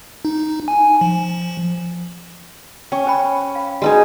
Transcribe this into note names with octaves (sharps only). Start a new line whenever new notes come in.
D#4
G#5
F3
C#4 G5 C#6
C5 G5 B5
F5 B5
G#3 D#4 F#4 G#4 B4 C5